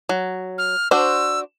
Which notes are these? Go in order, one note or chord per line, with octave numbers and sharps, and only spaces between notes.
F#3
F6
D4 F#4 C5 E6